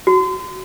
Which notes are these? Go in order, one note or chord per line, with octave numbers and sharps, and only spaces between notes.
F#4